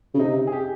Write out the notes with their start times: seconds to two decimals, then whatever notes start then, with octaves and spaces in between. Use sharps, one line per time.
0.14 C#3
0.19 C3 D#4
0.47 G#4
0.52 G4